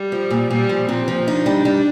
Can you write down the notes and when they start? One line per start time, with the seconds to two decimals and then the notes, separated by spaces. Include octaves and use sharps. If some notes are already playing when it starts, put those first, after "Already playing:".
Already playing: G3
0.12 F3
0.30 A#2
0.50 A#2 G3
0.69 F3
0.88 A#2 C4
1.08 F3
1.27 D4 D#4
1.46 G3
1.65 G3